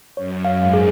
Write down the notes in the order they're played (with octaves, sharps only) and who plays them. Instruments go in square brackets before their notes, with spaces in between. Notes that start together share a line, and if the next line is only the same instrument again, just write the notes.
[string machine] F#2 [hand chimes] C#5
[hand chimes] F5
[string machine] G#2
[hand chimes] G#4